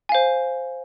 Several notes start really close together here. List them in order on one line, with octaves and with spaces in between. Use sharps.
G#5 F5 C5